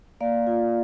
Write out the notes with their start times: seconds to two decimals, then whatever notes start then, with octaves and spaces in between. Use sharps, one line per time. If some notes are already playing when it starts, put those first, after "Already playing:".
0.21 A#3 D5 F5
0.47 F4